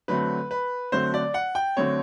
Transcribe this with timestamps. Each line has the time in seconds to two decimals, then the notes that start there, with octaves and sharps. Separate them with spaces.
0.08 D3 F#3 A3 C4 B4
0.51 B4
0.92 D3 F#3 A3 C4 C5
1.14 D5
1.34 F#5
1.55 G5
1.77 D3 F#3 A3 C4 C#5